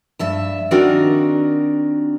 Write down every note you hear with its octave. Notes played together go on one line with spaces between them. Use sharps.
G2 E5 A5
D#3 C4 D4 D#4 F#4 A#4